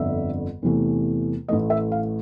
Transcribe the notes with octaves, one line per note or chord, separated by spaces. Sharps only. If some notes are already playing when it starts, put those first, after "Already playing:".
Already playing: G1 F2 D3 E5
E2 C3 E3 A3
A1 A2 E3 A3 D#5
E5
F5